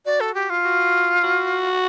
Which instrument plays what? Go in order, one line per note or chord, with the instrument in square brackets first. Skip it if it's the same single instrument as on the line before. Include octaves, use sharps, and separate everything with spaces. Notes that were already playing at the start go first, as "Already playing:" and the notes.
[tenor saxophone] F#4 [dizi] D5
[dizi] A4
G4
F4
[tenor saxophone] F#4
F#4